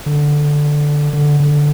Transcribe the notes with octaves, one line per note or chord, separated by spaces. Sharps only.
D3
D3
D3